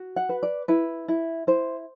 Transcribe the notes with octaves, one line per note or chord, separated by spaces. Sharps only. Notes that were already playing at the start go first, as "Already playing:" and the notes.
Already playing: F#4
F#5
B4
D5
E4 B4
E4
E4 C5